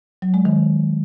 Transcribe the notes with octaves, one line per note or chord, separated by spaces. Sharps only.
F#3
G#3
D#3